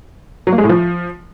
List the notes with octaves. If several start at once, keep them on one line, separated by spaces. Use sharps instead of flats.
F#3
A#3
G#3
A2
F3